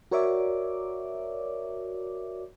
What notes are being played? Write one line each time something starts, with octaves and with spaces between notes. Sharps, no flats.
F#4 A#4 C#5 D5 E5 D6